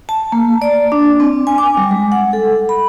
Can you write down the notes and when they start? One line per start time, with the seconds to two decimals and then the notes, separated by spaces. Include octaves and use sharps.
0.09 A5
0.32 A#3
0.62 D5
0.92 D4
1.20 C4
1.47 G#5
1.58 D6
1.77 G3
1.91 G#3
2.12 F#5
2.33 A4
2.69 B5